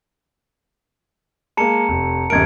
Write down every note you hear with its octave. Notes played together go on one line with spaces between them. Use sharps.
G#3 A#3 A5 A#5 C#7
F1
D#1 F#2 A#4 G#6 D7